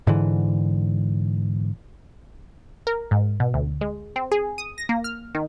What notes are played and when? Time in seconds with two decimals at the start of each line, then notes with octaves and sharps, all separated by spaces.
0.07 G#2 D3 E3
2.87 A#4
3.11 G#2
3.40 B2
3.54 D2
3.81 G#3
4.16 C4
4.31 G#4
4.58 D#6
4.78 A#6
4.89 A#3
5.04 F6
5.35 D#3